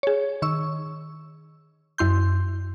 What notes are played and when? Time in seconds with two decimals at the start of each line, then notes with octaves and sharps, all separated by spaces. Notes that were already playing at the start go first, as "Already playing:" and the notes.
0.03 G#4 C#5
0.42 D#3 C#6 E6
1.98 F#2 E4 C6 G6